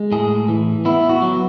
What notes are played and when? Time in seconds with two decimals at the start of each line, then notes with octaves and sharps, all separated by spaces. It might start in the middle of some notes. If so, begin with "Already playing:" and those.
Already playing: G#3
0.12 A2 G#4
0.48 E3
0.85 B3 E4
1.09 F#4
1.22 F#3